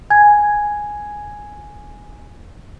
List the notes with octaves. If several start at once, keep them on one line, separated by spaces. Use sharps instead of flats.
G#5 G#6